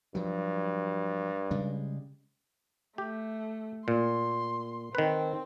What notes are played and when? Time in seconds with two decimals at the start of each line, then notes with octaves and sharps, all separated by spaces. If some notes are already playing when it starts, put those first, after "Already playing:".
0.15 G2 F3 F#3
1.51 C#3 G3 G#3
2.98 A3 G4
3.88 A#2 C6
4.95 D#3 C4 B4